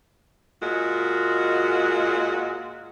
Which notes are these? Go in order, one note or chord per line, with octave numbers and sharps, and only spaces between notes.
A#2 G#3 F#4